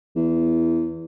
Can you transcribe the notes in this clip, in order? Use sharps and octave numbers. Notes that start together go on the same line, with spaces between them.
E2